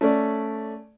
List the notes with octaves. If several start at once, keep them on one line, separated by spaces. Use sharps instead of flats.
A3 C#4 D5